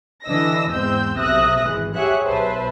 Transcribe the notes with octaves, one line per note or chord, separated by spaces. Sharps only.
D3 E3 D4 D#5 E6 A#6
E2 G#2 C4 E6 G6
B1 C3 E5 D#6 F#6 A#6
G#1 E3 G#3
G4 G#4 C#5 E5 F#5 F#6
B1 B4 C5 E5 A5